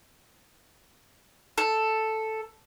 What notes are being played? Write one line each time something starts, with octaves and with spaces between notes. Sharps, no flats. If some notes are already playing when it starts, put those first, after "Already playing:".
A4